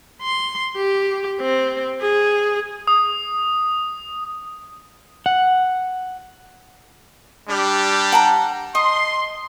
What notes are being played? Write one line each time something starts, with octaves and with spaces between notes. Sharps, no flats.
C6
G4
C4
G#4
D#6
F#5
G3 D4 G4
F#5 A5 A#5
D#5 C6